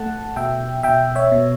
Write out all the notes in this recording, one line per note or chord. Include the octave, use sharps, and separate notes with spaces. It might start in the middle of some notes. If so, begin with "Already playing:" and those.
Already playing: A3 F#5 A5
B2 E5 G5
B2 E5 G5
C#5 E5
B2